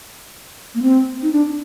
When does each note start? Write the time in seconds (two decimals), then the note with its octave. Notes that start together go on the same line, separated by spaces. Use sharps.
0.75 A#3
0.82 C4
1.22 D#4
1.32 D4